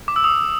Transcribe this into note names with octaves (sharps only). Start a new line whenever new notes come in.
D6
E6
D#6